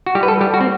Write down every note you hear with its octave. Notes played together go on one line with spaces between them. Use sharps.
F#4
G3 G4
B4
A4
G3 G4
F#4
C4